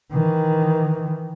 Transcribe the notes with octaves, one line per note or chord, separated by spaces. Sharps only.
D#3 E3